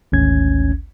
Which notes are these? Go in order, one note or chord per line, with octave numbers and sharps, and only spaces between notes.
G#1 D2 C#4 G#6